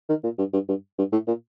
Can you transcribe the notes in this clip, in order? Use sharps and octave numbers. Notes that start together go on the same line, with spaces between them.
D#3
A#2
G2
G2
G2
G2
A2
A#2